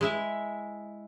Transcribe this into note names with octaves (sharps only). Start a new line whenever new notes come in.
G#3 E4 E5